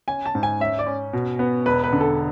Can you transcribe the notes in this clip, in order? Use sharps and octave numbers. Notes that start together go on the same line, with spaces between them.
C#4 G#5
A5
G#2
G#5
C#4 E5
D5
C#4
B2
B3
E1 B4
B4
D3
A4